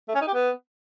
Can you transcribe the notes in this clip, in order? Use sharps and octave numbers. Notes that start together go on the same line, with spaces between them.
A3
C#4
D#4
G4
B3